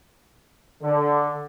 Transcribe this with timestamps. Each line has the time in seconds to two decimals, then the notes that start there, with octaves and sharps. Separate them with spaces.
0.82 D3